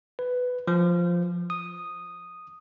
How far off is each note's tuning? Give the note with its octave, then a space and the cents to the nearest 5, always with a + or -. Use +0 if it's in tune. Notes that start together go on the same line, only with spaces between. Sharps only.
B4 +10
F3 +0
D#6 -5